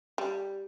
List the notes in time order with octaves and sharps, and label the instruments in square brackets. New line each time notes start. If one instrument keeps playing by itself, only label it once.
[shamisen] G3